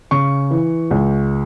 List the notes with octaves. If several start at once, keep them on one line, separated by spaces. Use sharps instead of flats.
C#3 C#6
E3
C#2